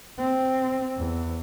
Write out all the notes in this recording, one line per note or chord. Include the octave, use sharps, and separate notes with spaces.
C4
E2